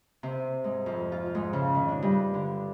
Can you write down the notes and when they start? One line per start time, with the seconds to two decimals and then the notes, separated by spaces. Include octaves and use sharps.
0.23 C3
0.64 G#2
0.86 F2
1.12 F4
1.35 G#2
1.53 C#3
1.74 D#3
1.89 D4
2.02 G2
2.34 D3